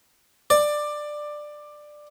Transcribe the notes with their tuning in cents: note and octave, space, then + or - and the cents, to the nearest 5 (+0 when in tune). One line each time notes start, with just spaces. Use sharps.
D5 +15